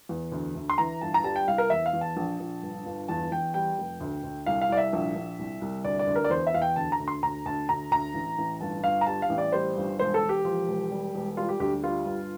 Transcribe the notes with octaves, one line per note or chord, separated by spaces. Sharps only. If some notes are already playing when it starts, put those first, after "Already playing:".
E2
D2
D2
C6
E3 A#5
G1 A5
A#5
G3 A5
G5
C2 F5
A#4
E2 E5
F5
E2
A5
A#1
A#1
G1
G1
E2 A5
E2 G5
G3 G5
F1
D2
D2
C2 F5
F5
C2 D5
E5
A#1
A#1
C2
C2
D2 D5
D5
D2
A#4
D5
E2 C5
E5
E2 F5
G5
D2 A5
A#5
D2
C6
D2 A#5
D2 A5
D2 A#5
D2 A#5
A1
A1
G1 A5
G1 F5
A#5
G3 A5
F5
A1
D5
G3 C5
G1
E1 C5
A4
E1
G4
F3
E1
G3
E1
G3 F4
G4
D2 G4
G3 F4
G1